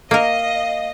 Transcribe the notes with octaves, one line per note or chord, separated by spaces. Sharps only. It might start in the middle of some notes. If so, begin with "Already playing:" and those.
A#3 A#4 D#5 F5